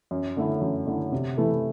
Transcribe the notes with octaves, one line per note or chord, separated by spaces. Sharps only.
F#2
D3 A3 E4
F#2
D3 A3 E4
C3
E3 A3 E4 A4